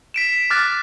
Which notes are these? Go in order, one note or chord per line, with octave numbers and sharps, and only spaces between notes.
B6 D7 E7
D6 F6 F#6 A6